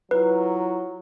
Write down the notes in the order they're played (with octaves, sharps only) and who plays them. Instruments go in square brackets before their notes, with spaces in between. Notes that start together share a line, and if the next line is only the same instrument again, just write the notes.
[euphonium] F#3 [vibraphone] E4 F4 A#5 [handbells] B4